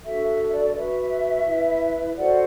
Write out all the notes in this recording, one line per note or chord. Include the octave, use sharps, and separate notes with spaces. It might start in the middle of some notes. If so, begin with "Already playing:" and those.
D4 F#4 A4 E5
E5
D5
D5
F#4 B4 E5
E4 B4
F#4 A4 C5 D5 F#5